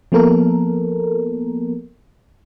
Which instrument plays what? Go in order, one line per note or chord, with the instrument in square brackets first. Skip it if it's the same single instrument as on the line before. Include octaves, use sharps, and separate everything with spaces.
[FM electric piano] F3 A#3 B3 A4 A#4